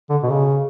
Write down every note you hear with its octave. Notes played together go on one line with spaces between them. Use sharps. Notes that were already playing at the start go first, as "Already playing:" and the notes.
D3
B2
C#3